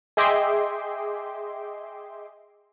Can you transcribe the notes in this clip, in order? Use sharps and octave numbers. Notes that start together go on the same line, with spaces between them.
G#4 D#5 E5 G5 C6 D6